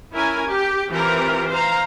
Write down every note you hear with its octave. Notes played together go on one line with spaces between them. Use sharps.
C#4 E4 A#4 G#5
G4
E3 C4 F4 G4 A#4
C5 F5 A#5